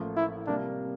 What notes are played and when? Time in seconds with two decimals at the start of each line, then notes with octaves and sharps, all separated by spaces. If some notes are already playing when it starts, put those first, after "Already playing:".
Already playing: A1 A2 F3 A#3 F4
0.16 E4
0.47 C3 G3 A#3 D4